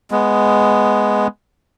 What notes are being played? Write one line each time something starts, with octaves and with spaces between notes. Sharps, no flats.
G#3 B3